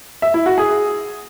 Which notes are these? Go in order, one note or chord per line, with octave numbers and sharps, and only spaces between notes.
E5
E4
F#4
G#4